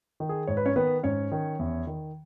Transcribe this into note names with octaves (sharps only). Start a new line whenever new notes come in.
D#3
G#4
G#2 C#5
B4
C#4 C#5
D#3 B3 B4
G#2 C#4 C#5
D#3
E2
D#3